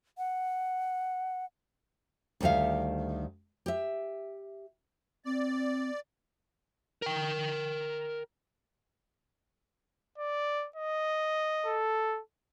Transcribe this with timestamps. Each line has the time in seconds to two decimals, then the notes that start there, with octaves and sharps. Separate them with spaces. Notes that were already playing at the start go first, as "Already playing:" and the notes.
0.18 F#5
2.41 D2 D#3 G3 E5 F5
3.66 G4 E5
5.25 C4 D5
7.02 A#4 G5
10.18 D5
10.76 D#5
11.65 A4